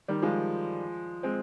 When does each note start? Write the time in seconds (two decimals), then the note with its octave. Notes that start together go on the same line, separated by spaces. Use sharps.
0.08 D#3 G3
0.22 F3 G#3
1.23 G#3 C4